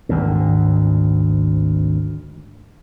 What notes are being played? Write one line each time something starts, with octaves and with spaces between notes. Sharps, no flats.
G#1 D2 G#2